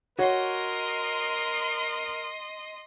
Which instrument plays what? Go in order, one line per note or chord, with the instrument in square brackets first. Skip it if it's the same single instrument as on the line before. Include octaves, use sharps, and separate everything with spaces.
[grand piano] F#4 C#5 [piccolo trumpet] A#4 [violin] D#5 C6